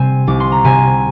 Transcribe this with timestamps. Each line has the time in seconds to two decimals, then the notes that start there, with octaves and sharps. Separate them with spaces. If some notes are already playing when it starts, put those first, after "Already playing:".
Already playing: C3 G3 C4 G#5
0.27 C2 D6
0.40 C6
0.52 A#5
0.64 C3 G#5